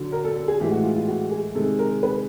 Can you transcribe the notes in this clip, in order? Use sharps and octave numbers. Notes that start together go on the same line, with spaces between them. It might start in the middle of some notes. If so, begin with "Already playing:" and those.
Already playing: D3 F#3
A#4
A4
A4
G#4
A2 E3 G#3 G4
F#4
F4
F4
F#4
G#4
C3 D#3 G#3 A4
A#4
B4